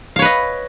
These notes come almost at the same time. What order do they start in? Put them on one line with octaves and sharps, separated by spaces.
F5 C#5 B4 D#5